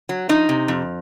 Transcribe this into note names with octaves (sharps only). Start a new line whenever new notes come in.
F#3
F3 D#4
C3
F2